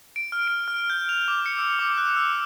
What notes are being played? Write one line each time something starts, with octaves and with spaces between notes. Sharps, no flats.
D7
F6
D7
F6
G6
F7
D6
C#7
E6
D6
F#6
E6